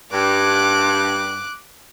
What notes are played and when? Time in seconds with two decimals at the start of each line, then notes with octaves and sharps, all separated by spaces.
0.12 G2 D6 F#6